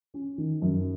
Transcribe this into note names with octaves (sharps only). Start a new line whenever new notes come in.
C#4
D#3
F#2